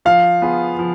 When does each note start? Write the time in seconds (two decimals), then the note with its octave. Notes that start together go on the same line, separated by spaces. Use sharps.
0.05 F3 F5
0.42 B3 F4 G#4
0.79 F3